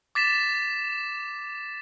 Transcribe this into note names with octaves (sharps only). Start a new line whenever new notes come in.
D6 A6 B6 E7